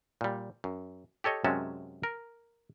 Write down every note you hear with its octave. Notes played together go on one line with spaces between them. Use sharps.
A#2 G3
F#2
G4 A4 C#5 D#5
F#2 C3 F#3 G#3 C#4 A5
A#4